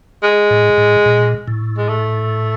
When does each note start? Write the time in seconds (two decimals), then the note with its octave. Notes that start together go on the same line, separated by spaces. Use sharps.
0.23 G#3
0.51 A2
0.78 A2
1.06 A#2
1.48 A2
1.78 G#3
1.89 A3